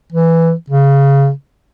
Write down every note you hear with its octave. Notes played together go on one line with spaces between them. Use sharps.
E3
C#3